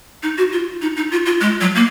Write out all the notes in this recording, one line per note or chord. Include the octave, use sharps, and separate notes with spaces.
D#4
F#4
F4
D#4
D#4
F4
F4
G#3
F#3
A#3